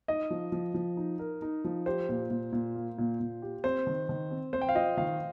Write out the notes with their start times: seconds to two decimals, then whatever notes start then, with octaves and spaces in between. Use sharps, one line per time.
0.08 D#4 D#5
0.30 F3
0.52 F3
0.74 F3
0.97 D#4
1.19 A#4
1.42 D#4
1.64 F3
1.86 G4 C5
2.09 A#2
2.30 A#2
2.52 A#2
2.75 A#3
2.98 A#2
3.20 A#2
3.42 G4
3.64 C4 C5
3.87 D#3
4.09 D#3
4.31 C4
4.53 C4 C5
4.61 G5
4.69 F5
4.75 F4 D#5
4.97 D#3 F5